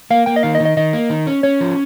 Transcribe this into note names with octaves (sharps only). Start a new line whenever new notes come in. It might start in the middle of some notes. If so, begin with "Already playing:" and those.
A#3 F5
A#3 G5
D#5
D#3 F5
D#5
D#3
D#5
D#3 D#5
A#3
D#3
C#4
C#4 C#5
F3